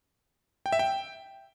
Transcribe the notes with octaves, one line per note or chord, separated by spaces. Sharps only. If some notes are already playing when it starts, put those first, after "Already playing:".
G5
E5
G5